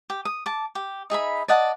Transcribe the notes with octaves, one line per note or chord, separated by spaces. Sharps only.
G4
D#6
A5 D6
G4
D#4 G#4 E5 B5
D5 D#5 F#5 A5